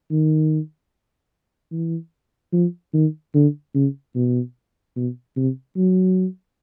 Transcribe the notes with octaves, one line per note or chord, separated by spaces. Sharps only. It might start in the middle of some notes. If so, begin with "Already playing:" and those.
D#3
E3
F3
D#3
D3
C#3
B2
B2
C3
F#3